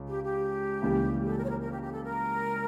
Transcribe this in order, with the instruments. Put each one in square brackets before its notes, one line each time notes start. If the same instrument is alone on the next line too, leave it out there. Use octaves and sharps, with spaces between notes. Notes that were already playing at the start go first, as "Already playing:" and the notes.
Already playing: [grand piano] C#2 C#3
[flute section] G4
G4
[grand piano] C#2 C#3 E3 G3 A#3
[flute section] A4
A#4
C#5
A#4
A#4
G4
G4
A4
A#4